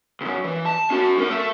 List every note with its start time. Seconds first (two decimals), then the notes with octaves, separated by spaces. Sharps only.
0.21 C#2 F#2
0.44 E3
0.66 A5
0.91 C#4 F#4
1.18 C#4 A#4
1.30 A3 A4